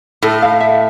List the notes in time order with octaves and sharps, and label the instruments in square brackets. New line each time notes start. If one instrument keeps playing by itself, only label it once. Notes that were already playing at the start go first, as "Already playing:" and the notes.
[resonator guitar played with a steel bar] A2 [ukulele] A4
[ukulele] F5
E5